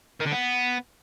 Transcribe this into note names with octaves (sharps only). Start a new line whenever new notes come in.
D#3
D3
B3